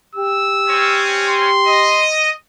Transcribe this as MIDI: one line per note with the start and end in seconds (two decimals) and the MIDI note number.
0.15 2.05 67
0.15 1.08 88
0.67 1.49 60
0.67 1.49 61
1.27 2.07 84
1.66 2.31 75